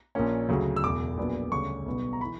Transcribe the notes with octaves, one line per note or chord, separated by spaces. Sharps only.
A#1 A#2 A#3 C#4
D2 C#3 F#3
E6
E1 E2 B2 D6
A#1 A#2 F#3 B3 D4
D2 C#3 G3 C#4 C#6
B1 B2 G3 B3
A#5
E3 B5